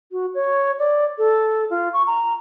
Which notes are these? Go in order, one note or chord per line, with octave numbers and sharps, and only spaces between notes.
F#4
C#5
D5
A4
F4
C#6
A#5